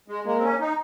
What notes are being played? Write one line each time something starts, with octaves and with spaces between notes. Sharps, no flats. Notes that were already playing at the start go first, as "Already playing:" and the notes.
G#3
G#3 A#3
C4
C#4
D#4